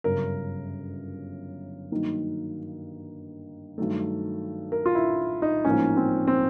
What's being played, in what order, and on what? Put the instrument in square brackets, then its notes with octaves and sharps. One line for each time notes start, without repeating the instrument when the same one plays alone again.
[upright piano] G1 F#2 C#3 [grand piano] A#4
[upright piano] G2 D#3 F#3 A#3 D#4
G2 D#3 F#3 A3
[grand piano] A#4
F4
E4
D#4
[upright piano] A1 G#2 F3 A#3 [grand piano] C#4
[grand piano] C4
C4